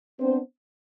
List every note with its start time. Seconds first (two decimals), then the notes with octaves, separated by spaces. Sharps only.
0.20 B3 C4 D4 C5